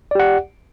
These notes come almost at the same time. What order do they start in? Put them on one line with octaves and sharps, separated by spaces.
D5 G4 F#5